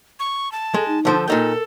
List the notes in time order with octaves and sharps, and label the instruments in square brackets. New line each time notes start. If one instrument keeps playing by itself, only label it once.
[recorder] C#6
A5
[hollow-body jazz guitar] G#3 [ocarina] A4
[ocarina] D#4
[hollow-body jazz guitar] D3 F3 C5 [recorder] A4
[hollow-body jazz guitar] A#2 D#4 G5 [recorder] A4 [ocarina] A#4